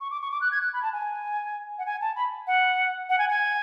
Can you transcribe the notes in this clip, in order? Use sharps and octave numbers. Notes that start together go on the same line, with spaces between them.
C#6
D6
C#6
D6
F#6
G#6
F#6
B5
A5
G#5
F#5
G#5
A5
B5
F#5
F#5
G#5
G#5